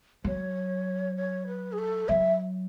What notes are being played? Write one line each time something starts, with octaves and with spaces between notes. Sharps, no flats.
F#3 C#5
C#5
B4
G#4
A4
F#3 E5